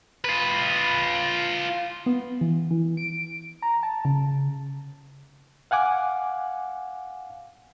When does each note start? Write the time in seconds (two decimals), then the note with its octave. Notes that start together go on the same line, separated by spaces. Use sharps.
0.25 F4 B4
2.06 B3
2.41 E3
2.71 E3
2.97 D7
3.62 A#5
3.83 A5
4.05 C#3
5.71 F5 F#5 G#5 D6